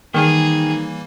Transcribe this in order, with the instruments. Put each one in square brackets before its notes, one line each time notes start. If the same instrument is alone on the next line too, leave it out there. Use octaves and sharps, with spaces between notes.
[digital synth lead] D#3 [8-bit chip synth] E3 G3 A#3 [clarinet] D#4 [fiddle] G#4